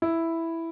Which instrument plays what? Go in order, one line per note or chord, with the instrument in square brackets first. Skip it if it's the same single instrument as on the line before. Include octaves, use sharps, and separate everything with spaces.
[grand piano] E4